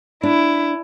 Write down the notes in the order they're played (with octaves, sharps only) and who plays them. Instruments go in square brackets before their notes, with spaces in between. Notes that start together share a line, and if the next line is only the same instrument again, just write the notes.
[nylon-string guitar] D4 [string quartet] E4